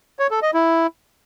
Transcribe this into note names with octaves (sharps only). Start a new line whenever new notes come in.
C#5
A4
D#5
E4